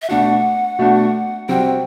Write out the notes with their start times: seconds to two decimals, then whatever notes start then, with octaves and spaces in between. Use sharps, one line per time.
0.02 E5
0.09 B2 A3 D4 F#4 F#5
0.79 B2 A3 D4 F#4
1.49 C3 G3 C4 F#4 G5